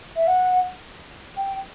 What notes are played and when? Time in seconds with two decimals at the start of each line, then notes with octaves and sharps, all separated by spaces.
0.16 E5
0.27 F#5
1.37 G5